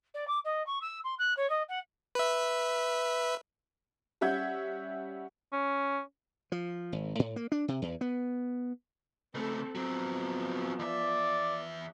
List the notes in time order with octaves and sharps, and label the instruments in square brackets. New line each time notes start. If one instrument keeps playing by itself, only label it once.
[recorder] D5
D6
D#5
C#6
E6
C6
F#6
C#5
D#5
F#5
[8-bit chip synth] B4 E5
[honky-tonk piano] G3 C#4 E5 F#5 G6 G#6
[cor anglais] C#4
[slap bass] F3
G#1
A2
A#3
D4
C3
E2
B3
[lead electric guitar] C#2 A3 [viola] C4 A4
[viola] F3 B3 [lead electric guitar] F#3 C4
[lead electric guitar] E2 E5 [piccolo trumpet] D5